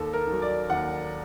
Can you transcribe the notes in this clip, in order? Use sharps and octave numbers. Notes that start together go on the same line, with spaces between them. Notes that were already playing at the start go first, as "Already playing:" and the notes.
Already playing: D#2 A4
A#4
D#3
F#3
D5
D#2 F#5